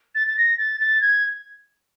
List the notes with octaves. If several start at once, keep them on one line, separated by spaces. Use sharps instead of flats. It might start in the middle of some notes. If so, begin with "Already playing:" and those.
A6
A6
A#6
A6
A6
G#6